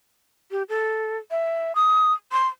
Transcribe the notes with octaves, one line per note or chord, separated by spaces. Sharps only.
G4
A4
E5
D#6
C6